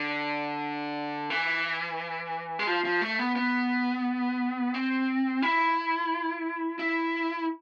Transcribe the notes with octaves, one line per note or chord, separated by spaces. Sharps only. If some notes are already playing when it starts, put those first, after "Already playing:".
Already playing: D3
E3
G#3
F3
F3
A3
B3
B3
C4
E4
E4